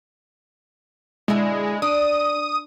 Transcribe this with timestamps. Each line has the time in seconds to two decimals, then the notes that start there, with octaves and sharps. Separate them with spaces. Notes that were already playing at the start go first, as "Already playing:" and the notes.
1.28 B2 D3 G#3 E4
1.82 D4 D#6